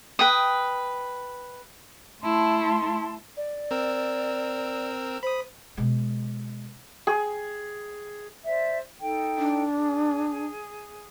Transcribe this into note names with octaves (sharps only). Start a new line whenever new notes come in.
B4 G5 D#6
A3 E4 A5 C6
D5
C4 A#4 E6
C5 B5 D#6
B2 G#3
G#4
C5 D5 E5
D#4 A4 G5
D4
G#4